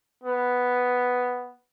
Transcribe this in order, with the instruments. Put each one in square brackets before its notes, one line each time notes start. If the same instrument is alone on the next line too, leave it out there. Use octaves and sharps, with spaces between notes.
[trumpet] B3